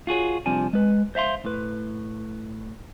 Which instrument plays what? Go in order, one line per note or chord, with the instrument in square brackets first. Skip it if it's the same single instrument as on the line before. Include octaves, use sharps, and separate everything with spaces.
[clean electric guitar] F4 F#4 G#4 C#5
C2 C3 F3 D4 G#5
G#3 B4
C5 E5 F5 C6
A2 B4